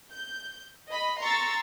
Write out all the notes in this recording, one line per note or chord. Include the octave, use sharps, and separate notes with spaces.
G6
D#5 B5
A#5 C6 C#6 E6 A6